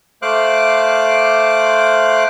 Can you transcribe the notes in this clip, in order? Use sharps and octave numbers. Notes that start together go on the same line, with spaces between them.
A3 C5 F5 D6 F#6